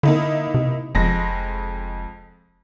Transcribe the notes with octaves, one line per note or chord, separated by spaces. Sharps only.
D3 A#3 D#4 E4
C3
F1 F2 G#3 A#6